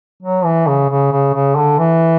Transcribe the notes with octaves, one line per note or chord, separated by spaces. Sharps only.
F#3
E3
C#3
C#3
C#3
C#3
D3
E3